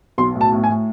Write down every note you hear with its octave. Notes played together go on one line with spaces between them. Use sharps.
B1 C6
A2
A5
A2
G#5
A2